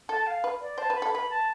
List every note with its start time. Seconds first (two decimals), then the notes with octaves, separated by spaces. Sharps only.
0.09 A4 A5
0.27 F5
0.44 B4
0.61 D5
0.78 C5 A5
0.90 B4
0.95 B5
1.02 A4
1.13 B4 B5
1.30 A5